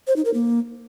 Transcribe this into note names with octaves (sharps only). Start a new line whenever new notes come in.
C5
D#4
A#4
A#3